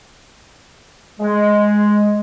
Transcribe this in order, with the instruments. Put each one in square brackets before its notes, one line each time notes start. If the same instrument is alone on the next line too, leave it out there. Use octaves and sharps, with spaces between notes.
[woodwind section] G#3